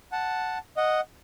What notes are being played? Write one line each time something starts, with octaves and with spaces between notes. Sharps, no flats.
F#5 A5
D#5 F#5